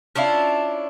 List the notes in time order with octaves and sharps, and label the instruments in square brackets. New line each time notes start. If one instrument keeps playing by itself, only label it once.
[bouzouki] C#4 D4 E4 F4